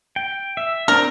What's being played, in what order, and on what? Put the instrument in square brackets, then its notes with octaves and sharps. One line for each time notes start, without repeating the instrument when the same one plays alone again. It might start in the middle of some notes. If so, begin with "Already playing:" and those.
[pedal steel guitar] G5
E5
[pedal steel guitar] C4 D4 [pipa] A#4